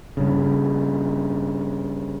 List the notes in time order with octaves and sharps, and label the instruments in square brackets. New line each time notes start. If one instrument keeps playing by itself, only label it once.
[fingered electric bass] G2 C#3